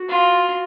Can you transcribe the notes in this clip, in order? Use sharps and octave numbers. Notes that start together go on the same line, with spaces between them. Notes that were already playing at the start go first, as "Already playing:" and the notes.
Already playing: F#4
F4